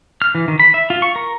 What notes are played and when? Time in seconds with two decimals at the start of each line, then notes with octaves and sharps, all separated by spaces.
0.22 F6
0.35 E3
0.48 D#3
0.60 B5
0.74 E5
0.90 F4
1.02 C#6
1.16 A#4